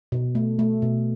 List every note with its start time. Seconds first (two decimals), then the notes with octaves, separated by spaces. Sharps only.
0.12 B2
0.35 A3
0.59 A3
0.82 B2